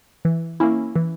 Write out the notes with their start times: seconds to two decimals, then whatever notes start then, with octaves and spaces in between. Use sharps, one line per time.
0.25 E3
0.60 A#3 C#4 E4
0.96 E3